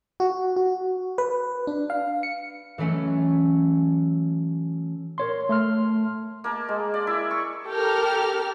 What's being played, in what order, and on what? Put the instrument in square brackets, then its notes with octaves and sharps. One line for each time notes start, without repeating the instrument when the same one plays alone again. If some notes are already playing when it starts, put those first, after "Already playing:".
[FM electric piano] F#4
F#4
B4
D4
F5
C#7
[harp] E3 F#3 A3 C#4
[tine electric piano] A#4 C#5 C6
A3 C6 F6
[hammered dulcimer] A#3 A5
G#3
D5
E4 E5
C#6
[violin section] G4 A4 A#4 F6